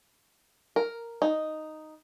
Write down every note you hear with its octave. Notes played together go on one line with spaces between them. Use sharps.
A#4
D#4